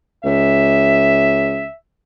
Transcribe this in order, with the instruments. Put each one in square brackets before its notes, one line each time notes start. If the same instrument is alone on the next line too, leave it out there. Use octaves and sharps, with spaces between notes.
[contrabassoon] C#2 [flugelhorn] E5